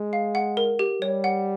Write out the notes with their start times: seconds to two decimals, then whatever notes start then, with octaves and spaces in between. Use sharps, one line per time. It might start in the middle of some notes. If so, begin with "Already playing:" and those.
Already playing: G#3
0.13 F5
0.35 F#5
0.57 A#4
0.79 G4
1.02 G3 C#5
1.24 F#5